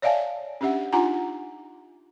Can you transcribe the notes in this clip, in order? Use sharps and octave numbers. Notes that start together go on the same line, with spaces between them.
C#5 D5 E5 F5 G#5 A5
C#4 D4 G4 E5 F#5
D4 D#4 F4 F#5 G#5 A#5